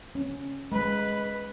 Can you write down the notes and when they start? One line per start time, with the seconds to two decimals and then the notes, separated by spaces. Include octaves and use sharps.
0.15 C#4
0.72 G#3 B4